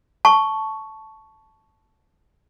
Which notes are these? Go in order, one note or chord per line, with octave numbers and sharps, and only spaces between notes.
A5 C#6